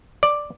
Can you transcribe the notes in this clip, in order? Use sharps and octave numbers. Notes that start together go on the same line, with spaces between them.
D5